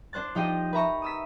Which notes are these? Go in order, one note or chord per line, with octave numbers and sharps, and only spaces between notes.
D4 C5 F#6 A6
F3 D#4 G4 D#5
B4 E5 A#5 C#6
D#6 E6 B6